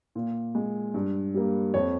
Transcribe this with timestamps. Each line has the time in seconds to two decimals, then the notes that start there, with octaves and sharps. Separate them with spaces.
0.15 A#2
0.55 G#3
0.94 G2
1.34 G3 A#3
1.74 F2 C#5